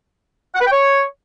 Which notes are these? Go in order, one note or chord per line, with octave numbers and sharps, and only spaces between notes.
F#5
B4
G5
C#5